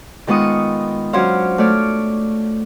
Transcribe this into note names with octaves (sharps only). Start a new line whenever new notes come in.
D#3 G#3 B3 F4 C#6 D#6
F#3 C#4 D4 C5 F5
A3 C#5 D5 F6